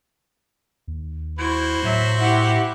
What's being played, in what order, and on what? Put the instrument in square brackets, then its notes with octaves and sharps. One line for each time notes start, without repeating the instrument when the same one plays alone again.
[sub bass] D#2
[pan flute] E4 [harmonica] F#4 C5
[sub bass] A2 [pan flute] F#3 [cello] E5
[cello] E4 G4 [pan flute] F#5